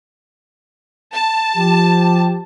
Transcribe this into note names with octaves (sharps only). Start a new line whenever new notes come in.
A5
F3 G4